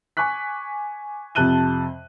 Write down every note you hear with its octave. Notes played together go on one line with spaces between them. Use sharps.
G#5 C#6 D6 F#6 B6
F2 C3 A5 F#6 D#7 G7